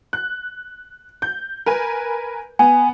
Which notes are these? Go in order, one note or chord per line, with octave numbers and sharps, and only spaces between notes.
F#6
G6
A#4 B4 G#5
B3 G#5